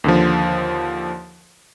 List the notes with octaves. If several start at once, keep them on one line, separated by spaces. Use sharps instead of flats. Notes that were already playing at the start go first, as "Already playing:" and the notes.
D#2 D3 F3